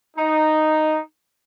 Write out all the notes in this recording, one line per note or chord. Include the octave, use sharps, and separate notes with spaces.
D#4